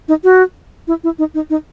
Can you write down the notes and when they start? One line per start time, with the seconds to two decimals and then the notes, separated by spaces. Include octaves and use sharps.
0.08 D#4
0.24 F#4
0.88 E4
1.04 E4
1.19 D#4
1.34 D#4
1.50 D#4